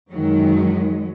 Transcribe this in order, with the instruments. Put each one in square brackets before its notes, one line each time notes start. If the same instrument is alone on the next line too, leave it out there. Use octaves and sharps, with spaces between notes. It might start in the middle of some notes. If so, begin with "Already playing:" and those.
[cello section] F#2 D#3 F#3 G#3